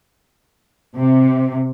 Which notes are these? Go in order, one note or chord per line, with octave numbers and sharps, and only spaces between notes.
C3